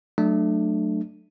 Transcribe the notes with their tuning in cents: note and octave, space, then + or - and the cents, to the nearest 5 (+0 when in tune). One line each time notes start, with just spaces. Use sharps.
F#3 +0 A3 +0 D4 +25